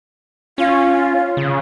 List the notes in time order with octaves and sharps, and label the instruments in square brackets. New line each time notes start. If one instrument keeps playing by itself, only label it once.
[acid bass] C#4 [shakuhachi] F4
[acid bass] C#3